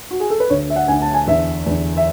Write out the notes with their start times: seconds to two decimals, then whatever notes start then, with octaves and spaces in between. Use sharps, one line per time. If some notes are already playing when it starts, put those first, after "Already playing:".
0.11 F#4
0.20 G#4
0.30 A4
0.40 B4
0.50 D2 D3 C#5
0.70 E5
0.76 F#5
0.88 D2 D3 G#5
1.02 A5
1.14 G#5
1.27 E2 D3 E5
1.66 E2 D3
1.97 E5